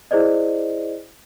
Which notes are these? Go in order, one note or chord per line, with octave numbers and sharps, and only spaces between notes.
E4 G#4 C5 D5 D#5